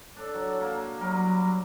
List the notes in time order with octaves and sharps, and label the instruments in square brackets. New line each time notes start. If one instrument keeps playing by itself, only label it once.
[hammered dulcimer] D4 [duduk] A4
[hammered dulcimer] F#3
A#3
[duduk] F#3 [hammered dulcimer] G3 A#4